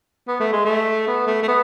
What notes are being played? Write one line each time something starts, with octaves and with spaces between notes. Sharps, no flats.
B3
A3
G#3
A3
B3
A3
A3
B3